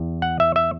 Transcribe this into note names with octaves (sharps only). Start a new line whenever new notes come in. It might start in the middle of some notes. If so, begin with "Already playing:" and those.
Already playing: E2
F#5
E5
E5